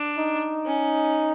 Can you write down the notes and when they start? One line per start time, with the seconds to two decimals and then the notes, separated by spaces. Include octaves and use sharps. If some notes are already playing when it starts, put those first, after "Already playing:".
Already playing: D4
0.18 D#4
0.66 C#4